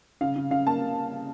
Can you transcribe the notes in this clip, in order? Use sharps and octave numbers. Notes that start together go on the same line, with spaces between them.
C#3 F5
C#3
C#3 F5
A#3 A5